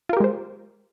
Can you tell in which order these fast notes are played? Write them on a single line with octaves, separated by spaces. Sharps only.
F4 A#4 G4 G#3 C5